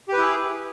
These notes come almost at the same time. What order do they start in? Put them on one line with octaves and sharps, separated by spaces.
G4 B4 E4 G#4